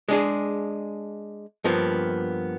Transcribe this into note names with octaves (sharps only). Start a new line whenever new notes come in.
G#3 D4 G#4
G2 F3 A#3 B3